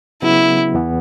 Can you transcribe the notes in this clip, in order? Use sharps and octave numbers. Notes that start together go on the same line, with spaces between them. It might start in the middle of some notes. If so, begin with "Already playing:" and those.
C#3 F#3 B3 E4
E2 E3 B3